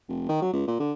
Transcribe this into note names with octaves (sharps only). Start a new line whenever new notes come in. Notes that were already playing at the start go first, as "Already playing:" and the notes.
F1
D#3
F#3
C#2
A#2
D3